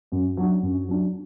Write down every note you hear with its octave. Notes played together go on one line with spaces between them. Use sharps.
F#2
F#3 D4
F#2
F#3 D4